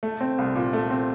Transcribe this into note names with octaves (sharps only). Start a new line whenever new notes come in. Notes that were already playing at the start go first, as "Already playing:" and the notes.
A3
C4
C2
A#2
A3
C4